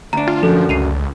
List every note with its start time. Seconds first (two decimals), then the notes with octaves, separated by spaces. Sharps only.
0.13 D2 D4 A#5
0.28 F4
0.43 F#2 F3 A4
0.69 C#2 C7 D#7 F7